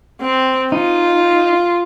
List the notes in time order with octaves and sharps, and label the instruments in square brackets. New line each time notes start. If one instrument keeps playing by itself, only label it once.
[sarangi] C4
[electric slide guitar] D#4 [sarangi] F4